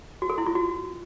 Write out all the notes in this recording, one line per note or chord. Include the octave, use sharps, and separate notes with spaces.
F#4
A4
E4
F4
F#4